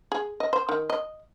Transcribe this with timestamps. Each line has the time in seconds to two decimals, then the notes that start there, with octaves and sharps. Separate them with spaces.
0.12 G#4
0.40 D#5
0.53 C5
0.69 D#3
0.90 D#5